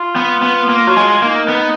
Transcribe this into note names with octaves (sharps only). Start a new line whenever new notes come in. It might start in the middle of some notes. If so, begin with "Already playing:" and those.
Already playing: F4
B3
B3
A#3
F#3
G#3
A#3 D#4
B3